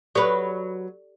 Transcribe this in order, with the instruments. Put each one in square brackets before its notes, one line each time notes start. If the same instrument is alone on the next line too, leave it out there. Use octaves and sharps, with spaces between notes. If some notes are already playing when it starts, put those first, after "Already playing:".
[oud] F#3 B4 [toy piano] G4 A4 D5